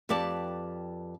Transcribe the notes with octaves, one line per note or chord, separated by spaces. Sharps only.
F2 G4 B4 D5 A5